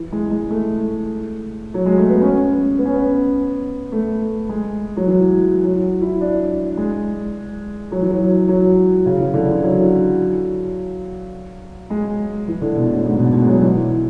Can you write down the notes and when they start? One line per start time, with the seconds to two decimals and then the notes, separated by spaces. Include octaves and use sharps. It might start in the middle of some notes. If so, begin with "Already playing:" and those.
Already playing: E3
0.12 G#3
0.31 G#3
0.50 A3
1.74 F#3
1.86 G#3
1.98 A3
2.09 B3
2.21 C#4
2.79 B3
2.85 C#4
2.93 B3
3.92 A3
4.49 G#3
4.97 F#3
5.06 E3
5.64 F#3
6.01 E4
6.21 D4
6.77 G#3
7.92 F#3
8.01 E3
8.10 F#3
8.48 F#3
9.06 C#3
9.19 E3
9.33 D3
9.48 E3
9.63 F#3
11.90 G#3
12.48 E3
12.61 D3
12.76 B2
12.91 A2
13.05 G#2
13.19 B2
13.33 B2
13.42 G#3
13.47 F#3
13.62 E3